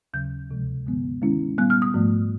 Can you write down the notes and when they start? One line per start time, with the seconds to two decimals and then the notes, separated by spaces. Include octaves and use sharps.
0.14 D#2 C#3 F#3 G6
0.50 D2 C3 F3 G#3
0.86 G2 D3 F3 G#3 B3
1.22 D#3 G#3 C#4 E4
1.58 A#2 G3 B3 F#6
1.70 F6
1.82 D#6
1.94 G#2 F3 A3